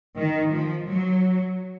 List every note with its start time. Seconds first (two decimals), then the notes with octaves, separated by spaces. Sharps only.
0.17 D#3
0.53 F3
0.88 F#3